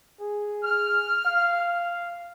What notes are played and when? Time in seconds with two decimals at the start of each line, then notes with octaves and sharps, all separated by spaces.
0.20 G#4
0.64 F6
1.26 F5